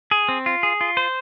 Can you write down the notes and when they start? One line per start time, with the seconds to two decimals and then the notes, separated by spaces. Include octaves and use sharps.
0.11 G#4
0.29 C4
0.46 F4
0.63 G#4
0.81 F4
0.97 C5